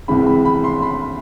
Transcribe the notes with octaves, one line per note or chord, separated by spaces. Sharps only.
C2 C3 E3 G#3 C4 B5
B5
B5
C6
B5